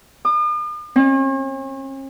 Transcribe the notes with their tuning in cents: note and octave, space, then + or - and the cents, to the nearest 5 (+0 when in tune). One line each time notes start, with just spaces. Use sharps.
D#6 -45
C#4 -45